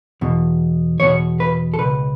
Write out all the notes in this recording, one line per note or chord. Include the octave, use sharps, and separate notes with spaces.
E2 B2
E2 B2 C#5
B4
A4
C#2 B2 B4